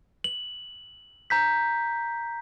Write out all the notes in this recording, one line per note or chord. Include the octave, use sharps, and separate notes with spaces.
F#7
A#5 G6 B6